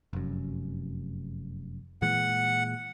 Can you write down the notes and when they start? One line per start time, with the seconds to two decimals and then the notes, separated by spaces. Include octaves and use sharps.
0.13 F1 F#2
2.02 A#2 E3 G#3 F#5